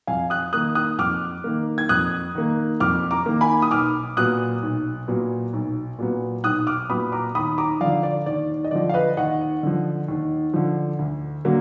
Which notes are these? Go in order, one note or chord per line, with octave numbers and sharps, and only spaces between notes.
F2 F5 G#5
D#6 F#6
D#3 A#3 D#6 F#6
D#6 F#6
F2 D6 F6
D#3 A#3
G#6
F2 D#6 F#6
D#3 A#3
F2 D6 F6
A#5 D6
D#3 A#3
G#5 B5
D#6
B1 D6 F6
A#2 F#3 B3 D#6 F#6
B1
A#2 F#3 B3
B1
A#2 F#3 B3
B1 D#6 F#6
D6 F6
A#2 F#3 B3 B5 D#6
A#5 D6
D#2 B5 D#6
A#5 D6
D3 F3 D5 F5
D5
D#2 D5
D#5
D3 F3 D5
F5
B4 D#5
D#2 D#5 F#5
D3 F3
D#2
D3 F3
D2
D3 F#3 A#3